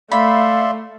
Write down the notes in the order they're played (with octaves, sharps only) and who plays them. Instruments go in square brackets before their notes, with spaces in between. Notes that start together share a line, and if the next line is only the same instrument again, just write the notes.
[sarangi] A3 [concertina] D5 E5 C6 [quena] F5 [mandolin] B5